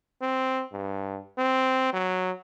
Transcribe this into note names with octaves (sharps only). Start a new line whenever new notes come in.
C4
G2
C4
F#3